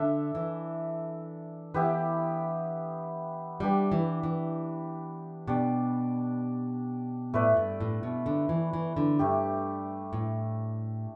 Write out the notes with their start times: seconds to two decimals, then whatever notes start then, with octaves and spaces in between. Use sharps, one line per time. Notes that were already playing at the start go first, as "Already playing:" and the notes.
Already playing: D3 D4 A4 E5
0.35 E3
1.74 E3 B3 E4 G4 B4
3.60 G3 D4 G4 B4
3.92 E3
4.23 E3
5.48 B2 D4 G4 D5
7.34 A2 A3 E4 B4 D5
7.57 G2
7.81 A2
8.03 B2
8.26 D3
8.49 E3
8.73 E3
8.97 D3
9.19 G2 A3 D4 G4
10.13 A2